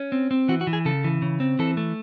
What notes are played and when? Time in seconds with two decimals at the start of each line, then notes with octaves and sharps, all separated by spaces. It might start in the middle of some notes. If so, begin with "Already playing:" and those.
Already playing: C#4
0.12 C4
0.31 C4
0.48 E3 F#4
0.61 F#4
0.67 E3
0.73 G#4
0.85 C#3 A4
1.04 E3
1.22 C#3
1.40 C4
1.59 E3 A4
1.77 A3